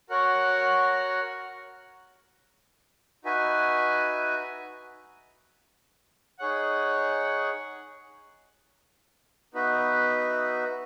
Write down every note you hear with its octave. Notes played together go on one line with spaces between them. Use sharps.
F#4 A#4 C#5 F#5
D#4 F#4 B4 E5 G#5
D#4 G#4 C#5 F#5
B3 D#4 F#4 B4 E5